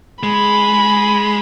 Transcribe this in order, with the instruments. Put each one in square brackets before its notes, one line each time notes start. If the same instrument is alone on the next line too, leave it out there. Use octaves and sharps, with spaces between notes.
[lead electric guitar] G#3 [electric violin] B5